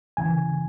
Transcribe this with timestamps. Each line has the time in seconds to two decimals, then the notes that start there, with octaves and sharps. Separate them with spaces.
0.17 C#3 E3 G#5